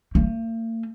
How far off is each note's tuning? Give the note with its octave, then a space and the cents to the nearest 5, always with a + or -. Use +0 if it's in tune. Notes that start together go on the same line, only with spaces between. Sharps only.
A#3 -45